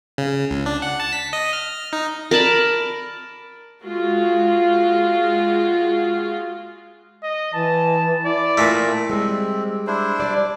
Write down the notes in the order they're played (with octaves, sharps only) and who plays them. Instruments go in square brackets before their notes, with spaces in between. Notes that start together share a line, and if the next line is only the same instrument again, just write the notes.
[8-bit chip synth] C#3
C#2
D4
F#5
A5
B6
D#5
F6
D#4
[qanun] A#4 D5 A5 B5
[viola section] G#3 F4 F#4
[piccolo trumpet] D#5
[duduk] E3 [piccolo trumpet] A5
[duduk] E4 [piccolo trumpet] D5
[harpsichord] A#2 A3
[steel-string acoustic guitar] G3 G#3 [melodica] C4
[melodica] D4 E4 C5
[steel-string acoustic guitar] G3 D5